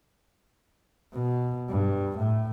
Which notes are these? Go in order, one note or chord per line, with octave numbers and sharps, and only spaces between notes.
B2
G2
A2